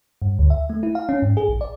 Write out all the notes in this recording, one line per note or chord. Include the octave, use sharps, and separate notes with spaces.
G2
D2
E5
A3
E4
F5
C#4
G#2
G#4
A#1
D5